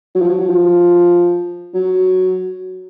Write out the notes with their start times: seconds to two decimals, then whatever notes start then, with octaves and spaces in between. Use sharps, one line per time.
0.15 F#3
0.22 F3
0.29 F#3
0.41 F#3
0.49 F3
1.74 F#3